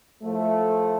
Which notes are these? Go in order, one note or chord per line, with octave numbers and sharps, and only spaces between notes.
A2 F3 A3